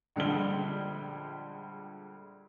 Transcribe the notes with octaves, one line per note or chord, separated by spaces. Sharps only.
A#1 D3 G3 G#3 G7